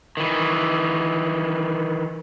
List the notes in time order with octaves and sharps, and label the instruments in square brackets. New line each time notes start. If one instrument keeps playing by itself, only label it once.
[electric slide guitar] D#3 E3